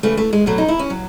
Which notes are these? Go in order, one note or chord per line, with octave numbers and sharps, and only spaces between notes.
C#3 E3 A3
A3
G#3
B2 F#3 A3
D#4
E4
C#4
F#3